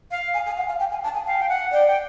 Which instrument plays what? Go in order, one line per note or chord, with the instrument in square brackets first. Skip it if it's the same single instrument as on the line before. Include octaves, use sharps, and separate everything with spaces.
[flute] F5
[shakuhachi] G#5
G#5
F#5
F5
G5
G#5
A5
G#5
[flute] F5 [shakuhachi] G5
[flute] G5
F#5
[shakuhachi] D5 [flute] G5
[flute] G5